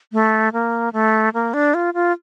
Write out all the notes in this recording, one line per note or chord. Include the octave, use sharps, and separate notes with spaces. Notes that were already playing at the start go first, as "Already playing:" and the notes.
A3
A#3
A3
A#3
D4
F4
F4